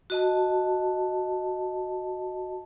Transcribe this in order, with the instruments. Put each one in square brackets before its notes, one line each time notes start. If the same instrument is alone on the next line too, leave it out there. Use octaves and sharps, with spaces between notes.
[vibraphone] F#4 D#5 A5